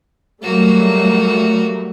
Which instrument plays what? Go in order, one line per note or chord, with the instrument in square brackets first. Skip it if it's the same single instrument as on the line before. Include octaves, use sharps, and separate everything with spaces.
[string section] F#3 G3 A3 [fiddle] A#3 F#4